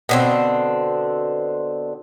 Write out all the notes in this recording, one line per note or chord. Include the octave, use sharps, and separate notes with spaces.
B2 D3 C4